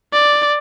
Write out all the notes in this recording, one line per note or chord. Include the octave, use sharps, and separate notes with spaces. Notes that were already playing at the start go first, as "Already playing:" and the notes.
D5